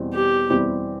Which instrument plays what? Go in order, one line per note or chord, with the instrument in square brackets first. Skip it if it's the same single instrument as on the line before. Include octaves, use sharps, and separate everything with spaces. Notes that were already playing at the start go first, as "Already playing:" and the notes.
Already playing: [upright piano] E2 B2 G3 C4 E4
[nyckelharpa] G4
[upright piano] E2 B2 G3 C4 E4